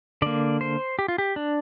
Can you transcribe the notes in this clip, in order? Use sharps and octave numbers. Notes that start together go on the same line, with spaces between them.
D3 A#3 D5
C5
G4
F4
G4
D4